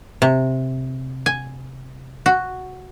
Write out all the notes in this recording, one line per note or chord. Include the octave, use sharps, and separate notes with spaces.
C3
G#5
F#4